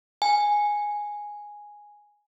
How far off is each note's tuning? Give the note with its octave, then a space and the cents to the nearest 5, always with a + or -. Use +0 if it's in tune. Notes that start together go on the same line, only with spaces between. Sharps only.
G#5 -5